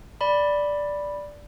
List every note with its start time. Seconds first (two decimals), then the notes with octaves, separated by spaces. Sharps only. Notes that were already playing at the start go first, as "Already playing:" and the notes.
0.21 D5 B5